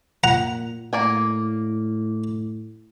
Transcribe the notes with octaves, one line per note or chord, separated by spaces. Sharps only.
A#2 F#5 A#5
A2 A#3 D5 G#5